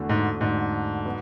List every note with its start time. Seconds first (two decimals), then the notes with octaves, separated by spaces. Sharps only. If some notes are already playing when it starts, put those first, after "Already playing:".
Already playing: E2 D3 A3 D4 F#4
0.09 G#2
0.41 E2 G#2 D3 A3 D4 F#4
1.06 F#3 B3